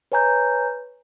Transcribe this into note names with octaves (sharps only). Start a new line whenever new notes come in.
B4 C#5 G#5 A#5 G6